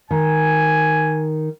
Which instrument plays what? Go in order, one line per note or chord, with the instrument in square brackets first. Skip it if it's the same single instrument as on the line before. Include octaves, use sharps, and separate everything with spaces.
[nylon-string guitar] D#3 [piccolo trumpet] G#5